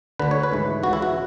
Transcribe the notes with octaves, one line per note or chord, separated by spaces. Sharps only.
D2 D3 B4
C#5
B4
G#2 E3
C#2 C#3 E3 F#4
E4
F#4